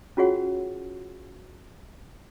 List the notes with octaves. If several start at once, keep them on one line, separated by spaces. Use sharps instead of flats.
C#4 F4 F#4 G#4 C#5 F#5